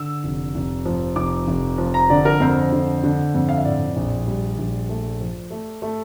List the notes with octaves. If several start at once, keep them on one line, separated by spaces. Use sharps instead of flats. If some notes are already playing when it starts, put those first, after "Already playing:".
Already playing: D3 E6
F1
F1
F3
F1 D6
F1
F3
A#5
D3 D5
A#4
F2 C5
D3
D3
F2
F5
E5
A2 D5
A#1
G3
A#1
A3
F3
A3
A3